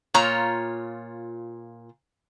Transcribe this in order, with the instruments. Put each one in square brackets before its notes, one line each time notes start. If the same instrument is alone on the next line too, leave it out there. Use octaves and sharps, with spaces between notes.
[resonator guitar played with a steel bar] A#2 F4 C#5 A#5